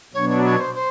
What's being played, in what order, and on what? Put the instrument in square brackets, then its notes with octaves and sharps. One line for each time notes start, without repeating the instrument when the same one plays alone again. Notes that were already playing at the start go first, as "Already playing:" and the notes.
[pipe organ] B2 F#3 B3 D4 [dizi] C#5
[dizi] C#5
C#5
C5
C5